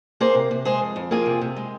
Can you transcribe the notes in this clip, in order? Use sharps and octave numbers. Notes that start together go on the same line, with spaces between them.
A#3 G#4 C5
C3
C3
G#3 G#4 C5
F2
F2
A#3 F4 G#4
C3
C3
G#3